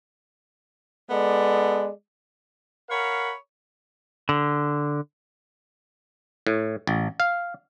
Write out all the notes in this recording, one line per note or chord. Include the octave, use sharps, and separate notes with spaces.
G#3 B3 A4 D5
A#4 C#5 F5 F#5 B5
D3
A2
A1
F5